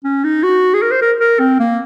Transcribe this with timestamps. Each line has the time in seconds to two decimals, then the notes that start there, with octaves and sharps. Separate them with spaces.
0.04 C#4
0.24 D#4
0.43 F#4
0.74 G#4
0.82 A#4
0.91 C5
1.02 A#4
1.21 A#4
1.40 C4
1.60 A#3